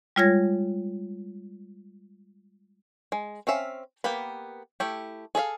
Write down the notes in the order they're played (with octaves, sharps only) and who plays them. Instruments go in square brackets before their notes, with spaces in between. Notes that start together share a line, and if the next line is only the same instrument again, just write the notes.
[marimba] G3 G#3 F4 C#5 G#6 A#6
[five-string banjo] G#3
C4 C#4 E5 F5
A#3 B3 G4 B4 B5
A3 E4 G4
G#4 A4 E5 F5